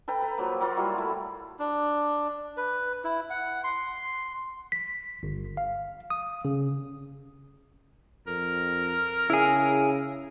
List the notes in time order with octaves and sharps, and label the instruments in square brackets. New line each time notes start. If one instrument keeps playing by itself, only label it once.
[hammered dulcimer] A4 B4 G5 A#5
B4
F3 F#3 A#3
F#3 A#3 F4
G3 E4 F#4
A3
[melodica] D4
B4
E4
F#5
C6
[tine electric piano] B6
G1
F5
D#6
C#3
[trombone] F2 [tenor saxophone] A#4
[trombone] C#3 [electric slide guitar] E4 G#4